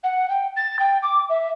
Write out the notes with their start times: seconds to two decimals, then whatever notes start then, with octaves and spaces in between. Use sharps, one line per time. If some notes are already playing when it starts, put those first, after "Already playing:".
0.03 F#5
0.29 G5
0.56 A6
0.79 G5
1.02 D6
1.29 E5